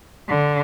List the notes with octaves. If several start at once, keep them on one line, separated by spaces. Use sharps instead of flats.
D3